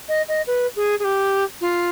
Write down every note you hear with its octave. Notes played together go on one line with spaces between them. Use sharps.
D#5
D#5
B4
G#4
G#4
G4
F4